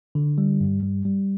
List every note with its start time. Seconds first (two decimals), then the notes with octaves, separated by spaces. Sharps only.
0.15 D3
0.38 G3
0.60 G2
0.83 G3
1.05 G3